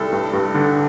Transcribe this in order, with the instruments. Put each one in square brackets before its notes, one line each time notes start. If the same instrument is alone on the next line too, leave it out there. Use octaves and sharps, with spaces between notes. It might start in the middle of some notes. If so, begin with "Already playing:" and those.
Already playing: [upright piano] C2 A4
G2
G2
D3